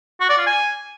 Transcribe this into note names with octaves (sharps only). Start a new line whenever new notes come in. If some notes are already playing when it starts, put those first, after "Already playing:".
F#4
D5
F4
G#5